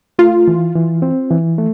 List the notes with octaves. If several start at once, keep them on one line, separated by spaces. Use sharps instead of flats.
A3 F4
E3
E3
C4
E3
A3